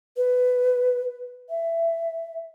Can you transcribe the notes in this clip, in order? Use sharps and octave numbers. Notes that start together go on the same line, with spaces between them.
B4
E5